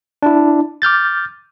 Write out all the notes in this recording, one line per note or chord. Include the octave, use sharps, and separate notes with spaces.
D4 E4
D6 F6 G6 A6